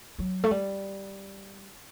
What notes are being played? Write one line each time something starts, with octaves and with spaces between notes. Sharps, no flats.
F#3
A3
G3